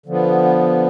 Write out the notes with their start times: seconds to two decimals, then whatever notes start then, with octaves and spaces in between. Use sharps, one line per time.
0.06 D3 F3 B3